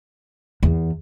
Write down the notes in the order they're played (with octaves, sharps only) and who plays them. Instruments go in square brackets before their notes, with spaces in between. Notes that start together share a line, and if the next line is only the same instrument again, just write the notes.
[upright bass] E2